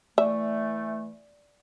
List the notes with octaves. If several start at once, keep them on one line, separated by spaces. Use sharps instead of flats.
E3 A3 D5 E5